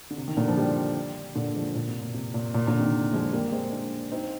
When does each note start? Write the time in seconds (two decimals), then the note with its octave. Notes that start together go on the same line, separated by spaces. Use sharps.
0.10 D3
0.17 C3
0.28 D#3
0.37 A#2 D3
0.48 F3
0.56 D#3 G3
1.35 A#2 D3
1.55 F3 G#3
1.75 A#2
1.88 C3
2.01 A#2
2.14 C3
2.34 A#2
2.54 A#2
2.67 A#2 D3
2.80 C3 D#3
3.13 F3 G#3
3.32 G3 A#3
3.52 G#3 C4
3.72 A#3 D4
4.12 C4 D#4